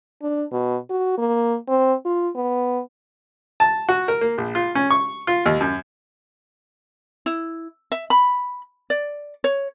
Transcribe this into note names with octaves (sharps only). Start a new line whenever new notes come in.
D4
B2
F#4
A#3
C4
F4
B3
A5
F#4
A#4
A#3
A#1
F4
C#4
C#6
F4
D#2
F#2
E4
E5
B5
D5
C#5